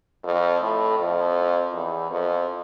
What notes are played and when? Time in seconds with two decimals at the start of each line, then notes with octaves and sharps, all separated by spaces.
0.24 F2
0.61 A2
0.99 F2
1.74 E2
2.11 F2